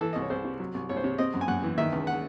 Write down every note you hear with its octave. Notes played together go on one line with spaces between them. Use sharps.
E3 A4
C2 D#5
C#5
C2 C5
C3
F#3
C2
C2 C#5
C5
C3 C#5
C4 D#5
F#2
G#5
F#2 F#5
E3
D#3 E5
C#2
F#5